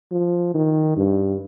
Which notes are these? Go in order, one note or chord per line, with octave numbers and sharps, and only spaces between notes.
F3
D#3
G2